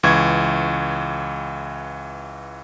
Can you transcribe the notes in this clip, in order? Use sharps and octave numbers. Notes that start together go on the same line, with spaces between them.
C#2 E3 C#6 G#6